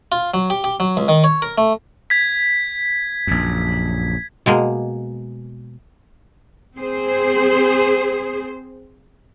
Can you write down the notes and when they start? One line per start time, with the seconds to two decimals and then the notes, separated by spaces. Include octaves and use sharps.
0.12 F4
0.34 F#3
0.50 G4
0.64 G4
0.80 F#3
0.97 C#2
1.08 D#3
1.24 C#5
1.42 A#4
1.58 A3
2.10 G#6 B6
3.27 A#1 F#2
4.46 B2 G#3 A#3
6.76 C4 G#4 C5